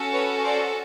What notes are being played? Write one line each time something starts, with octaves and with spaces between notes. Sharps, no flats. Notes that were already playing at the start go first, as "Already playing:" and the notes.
Already playing: C#4 F#4 A4
B4 C#5
C5 D5